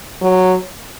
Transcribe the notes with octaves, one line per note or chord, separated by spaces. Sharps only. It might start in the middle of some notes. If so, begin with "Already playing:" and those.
F#3